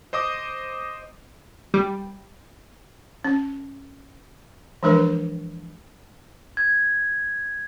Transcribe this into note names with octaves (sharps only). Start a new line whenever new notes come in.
C5 D#5 D6 D#6
G3
C#4
E3 F3 G#3 D4 A#4 B4
G#6